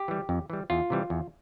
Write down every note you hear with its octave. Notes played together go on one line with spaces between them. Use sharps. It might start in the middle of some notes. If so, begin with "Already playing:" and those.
Already playing: G4
E3 G3
F2
E3 G3
E2 F4
C3 E3 G3
E2